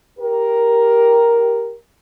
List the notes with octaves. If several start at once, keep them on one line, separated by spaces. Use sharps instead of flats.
G4 A#4